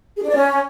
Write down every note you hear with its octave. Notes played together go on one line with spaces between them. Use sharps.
G#4
D4
D5
C#4